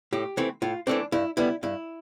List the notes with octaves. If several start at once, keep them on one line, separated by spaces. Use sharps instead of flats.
A2 G4
E3 A3 C4
A2 F4
E3 A3 C4 D4
G2 E4
D3 G3 B3 E4
G2 E4